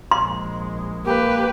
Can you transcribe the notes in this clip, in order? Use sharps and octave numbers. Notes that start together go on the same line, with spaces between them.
A#1 G#3 C6
A#3 G4 B4